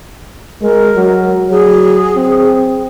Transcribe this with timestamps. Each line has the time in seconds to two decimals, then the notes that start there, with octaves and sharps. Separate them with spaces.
0.62 G#3 A#4
0.96 F#3
1.51 F#3 G#4
2.16 C4